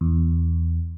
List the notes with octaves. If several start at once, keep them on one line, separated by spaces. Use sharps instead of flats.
E2